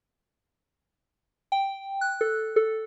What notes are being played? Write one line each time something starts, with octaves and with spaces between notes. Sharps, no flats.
G5
F#6
A4
A4